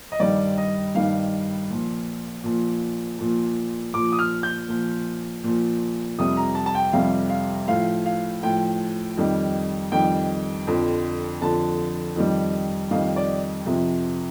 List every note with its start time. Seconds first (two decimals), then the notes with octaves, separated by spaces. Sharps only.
0.12 D#5
0.20 G2 D#3 G3 D5
0.58 D#5
0.95 G2 D#3 G3 F5
1.70 A#2 F3
2.44 A#2 F3
3.19 A#2 F3
3.94 A#2 F3 D6
4.12 D#6
4.19 F6
4.43 G6
4.69 A#2 F3
5.44 A#2 F3
6.18 F2 C3 G3 D#6
6.37 A#5
6.55 A5
6.66 A5
6.75 G5
6.93 F2 C3 G3 F5
7.30 F5
7.68 A2 F3 F5
8.06 F5
8.43 A2 F3 G5
9.17 F2 D#3 G3
9.92 F2 D#3 G3 G5
10.67 F2 D3 F3
11.41 F2 D3 F3 A5
12.16 F2 D#3 G3
12.91 F2 D#3 G3 F5
13.16 D5
13.66 F2 C3 F3